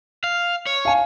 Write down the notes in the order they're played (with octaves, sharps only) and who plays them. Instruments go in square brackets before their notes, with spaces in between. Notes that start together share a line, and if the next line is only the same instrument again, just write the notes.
[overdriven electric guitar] F5
C#5
[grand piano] F5 G#5